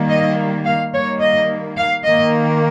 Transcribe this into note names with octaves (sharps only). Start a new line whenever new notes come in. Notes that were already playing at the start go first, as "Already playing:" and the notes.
Already playing: D#3 G3 A#3
D#5
F5
D#3 G3 A#3 C#5
D#5
F5
D#3 A#3 D#5